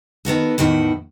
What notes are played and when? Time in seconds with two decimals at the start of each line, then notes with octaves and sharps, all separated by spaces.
0.25 D#3 B3 F#4 A4
0.58 E2 A2 D#3 F#4